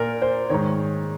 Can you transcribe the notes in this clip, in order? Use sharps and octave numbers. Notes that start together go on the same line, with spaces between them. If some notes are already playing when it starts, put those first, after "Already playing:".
Already playing: A#2 A#4
C5
G#2 D#3 C#5